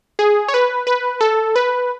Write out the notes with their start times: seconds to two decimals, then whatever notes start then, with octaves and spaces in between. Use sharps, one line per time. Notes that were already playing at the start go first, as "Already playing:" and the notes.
0.19 G#4
0.48 C#5
0.54 B4
0.87 B4
1.21 A4
1.56 B4